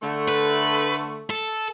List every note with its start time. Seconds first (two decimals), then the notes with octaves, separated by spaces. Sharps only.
0.02 D3 A3
0.28 B4
1.30 A4